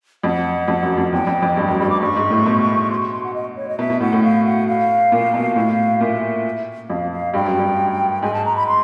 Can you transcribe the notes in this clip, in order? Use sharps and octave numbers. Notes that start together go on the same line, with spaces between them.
F2 F#5
F2
F#2
F2
E2 G5
F2
F2
G2
F#2 G5
G2 B5
D6
G2 C#6
G#2
A2
B2
C6
C#6
C6
F#5
D#5
C#5
D#5
B2 E5
B2
A2 F#5
A2
F5
F#5
F5
A#2
B2
A2 F5
A#2 E5
F2 F5
F5
G2 G5
F#2
G2
G#2 G#5
A5
A#5
B5
C6